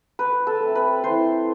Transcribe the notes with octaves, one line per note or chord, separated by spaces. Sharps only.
D3 B4
A4
A3 C4
B4
E3 C5